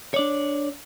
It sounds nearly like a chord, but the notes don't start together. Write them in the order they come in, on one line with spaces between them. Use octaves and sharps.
C#5 D5 D4